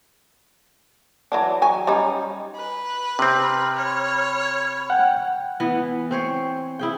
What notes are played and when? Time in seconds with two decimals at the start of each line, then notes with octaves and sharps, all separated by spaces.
1.32 E3 F#3 D4
1.62 F#3 G#5
1.87 G3 C#4 D#4
2.56 B4
3.19 C3 C4 B5 F6
3.76 C#5
4.90 F#5 G5
5.60 E3 B3
6.11 C4 C5 C#5
6.79 E4 G#4 G5